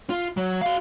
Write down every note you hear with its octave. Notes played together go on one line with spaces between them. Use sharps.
F4
F#3
F#4 F5